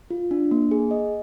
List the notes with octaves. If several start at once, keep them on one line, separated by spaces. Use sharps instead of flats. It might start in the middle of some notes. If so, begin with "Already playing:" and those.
F4
D4
A#3
G#4
D#5